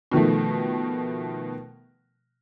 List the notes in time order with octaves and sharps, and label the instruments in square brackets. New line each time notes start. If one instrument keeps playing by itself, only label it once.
[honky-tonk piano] B2 D#3 F3 A3